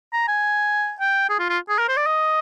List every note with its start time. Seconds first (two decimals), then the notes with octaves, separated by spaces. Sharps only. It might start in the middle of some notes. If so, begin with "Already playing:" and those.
0.13 A#5
0.28 G#5
1.00 G5
1.29 G#4
1.39 F4
1.50 F4
1.69 G#4
1.79 A#4
1.88 C5
1.97 D5
2.07 D#5